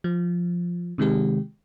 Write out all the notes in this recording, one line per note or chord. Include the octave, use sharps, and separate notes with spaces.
F3
C3 D#3 G#3 G4